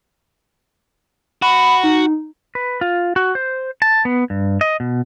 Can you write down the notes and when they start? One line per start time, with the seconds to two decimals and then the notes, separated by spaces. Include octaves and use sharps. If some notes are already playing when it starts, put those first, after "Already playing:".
1.42 F#4 B5
1.84 D#4
2.55 B4
2.81 F4
3.16 F#4
3.35 C5
3.82 A5
4.05 B3
4.30 G2
4.61 D#5
4.80 B2